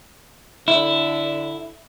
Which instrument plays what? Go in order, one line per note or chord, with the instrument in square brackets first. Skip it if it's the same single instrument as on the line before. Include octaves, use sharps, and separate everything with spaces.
[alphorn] D3 [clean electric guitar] E4